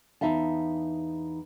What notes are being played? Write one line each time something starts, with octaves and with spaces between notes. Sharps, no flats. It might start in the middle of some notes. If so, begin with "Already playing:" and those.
E2 G#3 D#4 E5 F5 A5